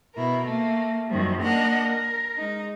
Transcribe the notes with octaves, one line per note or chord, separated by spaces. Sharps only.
B2 E4 A#4
A3 A#3
F#2 D#3 F3 G3
A#3 D4 A#4 D#5 F#5 F6
A#4
G#3 D#4